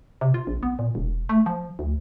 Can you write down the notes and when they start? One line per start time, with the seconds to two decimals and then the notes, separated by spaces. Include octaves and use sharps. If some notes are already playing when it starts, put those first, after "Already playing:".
0.21 C3
0.34 F4
0.47 A#1
0.63 B3
0.79 A#2
0.95 E1
1.29 A3
1.46 F3
1.79 D2